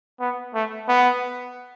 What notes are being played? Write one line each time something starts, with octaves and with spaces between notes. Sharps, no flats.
B3
A3
B3